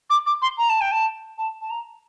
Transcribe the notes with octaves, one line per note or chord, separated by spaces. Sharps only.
D6
D6
C6
A#5
A5
G5
A5
A5
A5
A#5